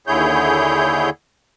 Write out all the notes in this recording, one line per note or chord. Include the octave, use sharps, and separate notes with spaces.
D#2 D3 E4 G#4 C#5 G6